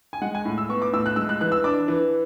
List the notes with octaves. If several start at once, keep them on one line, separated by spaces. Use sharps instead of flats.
G#5
G#3 F#5
G#5
A2
E6
B3 C#6
D6
A2 E6
F#6
G#3 E6
F#6
E3 F#6
E6
D4 D6
E3